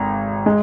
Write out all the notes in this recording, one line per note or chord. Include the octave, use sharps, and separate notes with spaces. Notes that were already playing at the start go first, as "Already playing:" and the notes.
Already playing: G#1 A#5
G#3